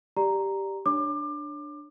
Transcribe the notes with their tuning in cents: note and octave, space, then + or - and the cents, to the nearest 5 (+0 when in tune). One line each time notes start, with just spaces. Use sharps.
G4 +0 D5 +0 A#5 +0
D4 +10 C#5 +0 D6 +25